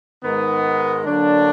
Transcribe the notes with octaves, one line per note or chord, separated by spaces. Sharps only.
G#2 D#3 G#3 B3
D3 F#3 A#3 D4